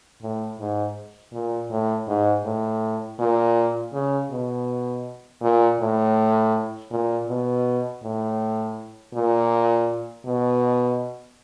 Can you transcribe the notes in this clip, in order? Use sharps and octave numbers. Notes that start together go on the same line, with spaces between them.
A2
G#2
A#2
A2
G#2
A2
A#2
C#3
B2
A#2
A2
A#2
B2
A2
A#2
B2